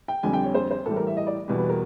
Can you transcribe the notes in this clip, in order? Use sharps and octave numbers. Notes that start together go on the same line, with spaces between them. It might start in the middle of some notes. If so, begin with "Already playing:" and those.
G5
F2 D3 G3 G#5
G5
C#5
C5
C5
A2 E3 G3 A4
A#4
E5
D#5
D5
E2 B2 G3
B4
A#4